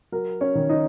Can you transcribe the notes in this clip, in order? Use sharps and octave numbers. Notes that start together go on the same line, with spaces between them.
F#3 A#4
C#4 C#5
D#3
D#4 D#5